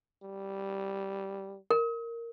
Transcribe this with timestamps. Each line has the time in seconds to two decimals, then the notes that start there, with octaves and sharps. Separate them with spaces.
0.23 G3
1.71 A#4